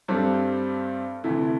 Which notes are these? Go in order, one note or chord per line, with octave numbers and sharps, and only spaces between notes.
G2 G3 C4 A4
D2 C3 E3 A3 E4